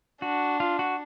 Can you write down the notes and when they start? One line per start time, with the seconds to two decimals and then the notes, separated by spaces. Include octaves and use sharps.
0.22 D4 F#4
0.60 F4
0.79 F#4